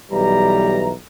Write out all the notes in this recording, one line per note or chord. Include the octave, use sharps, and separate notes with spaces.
B1 E3 G3 A#5